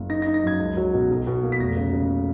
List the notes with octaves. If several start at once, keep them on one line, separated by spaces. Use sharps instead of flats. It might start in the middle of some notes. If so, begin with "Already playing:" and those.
Already playing: F#1
D#4 A#6
A#6
D#4
A#6
F#2 G#6
C#2
F#3
B2
B1
B2
A#3
B6
F1 A#6
C#3
C#3